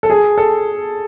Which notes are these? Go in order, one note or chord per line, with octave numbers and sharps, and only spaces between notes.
A4
G#4
A4